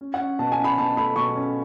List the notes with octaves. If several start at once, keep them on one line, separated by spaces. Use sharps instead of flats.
C#4
F#5
C#4
B2 A5
G#5
C#4
B5
B2 A5
A3 B5
B2 C#6
C#4